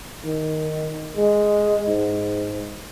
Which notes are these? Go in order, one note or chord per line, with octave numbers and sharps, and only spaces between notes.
D#3
G#3
G#2